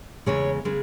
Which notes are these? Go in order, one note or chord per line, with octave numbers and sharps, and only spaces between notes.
E2 C#3 G#3 C#5
C#3 G#3